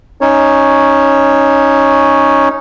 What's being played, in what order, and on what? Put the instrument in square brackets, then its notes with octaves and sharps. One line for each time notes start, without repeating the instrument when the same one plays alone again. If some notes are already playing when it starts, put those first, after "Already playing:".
[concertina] C#4 D#4 C#5